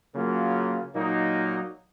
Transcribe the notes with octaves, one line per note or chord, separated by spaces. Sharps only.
C#3 F#3 A#3 F4
A#2 F#3 A#3 D#4